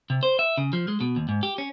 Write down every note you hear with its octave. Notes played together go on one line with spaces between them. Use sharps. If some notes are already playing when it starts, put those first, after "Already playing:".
C3
C5
E5
C#3
F3
G#3
B2
D#2
G#2
G4
C#4